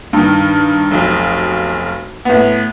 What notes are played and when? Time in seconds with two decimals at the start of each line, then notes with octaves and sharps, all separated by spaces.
0.13 G2 D#3
0.91 F1 B1
2.25 A2 B3